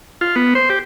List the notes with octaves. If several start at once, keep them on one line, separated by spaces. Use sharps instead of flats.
F4
B3
C5
G4